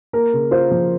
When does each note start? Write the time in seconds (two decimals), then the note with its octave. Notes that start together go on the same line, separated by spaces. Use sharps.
0.13 A#3 A#4
0.33 C#3
0.51 F4 C5
0.71 F3